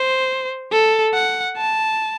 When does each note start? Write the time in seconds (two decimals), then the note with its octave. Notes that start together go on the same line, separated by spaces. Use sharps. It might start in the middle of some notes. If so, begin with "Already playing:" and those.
Already playing: C5
0.72 A4
1.14 F#5
1.57 A5